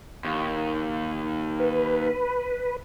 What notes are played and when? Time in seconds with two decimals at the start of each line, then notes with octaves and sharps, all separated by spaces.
0.24 D#2
1.60 B4